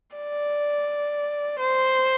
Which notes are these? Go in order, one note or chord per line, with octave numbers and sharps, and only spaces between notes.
D5
C5